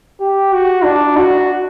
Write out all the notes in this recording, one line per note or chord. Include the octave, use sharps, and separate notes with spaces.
G4
F#4
D4
F#4